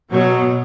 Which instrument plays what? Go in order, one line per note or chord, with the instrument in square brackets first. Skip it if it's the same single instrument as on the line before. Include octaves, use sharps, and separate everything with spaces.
[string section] B2 F#3